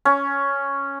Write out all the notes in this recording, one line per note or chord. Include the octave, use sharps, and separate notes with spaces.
C#4